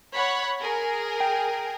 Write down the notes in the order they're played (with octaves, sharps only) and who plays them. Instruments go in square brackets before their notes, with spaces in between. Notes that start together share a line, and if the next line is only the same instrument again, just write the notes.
[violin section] C#5 F#5 B5
G#4 A#4
[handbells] G5